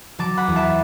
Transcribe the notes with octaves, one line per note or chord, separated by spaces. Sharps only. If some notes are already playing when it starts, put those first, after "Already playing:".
F#3 A5 D6
F#5 B5
E2
E5 A5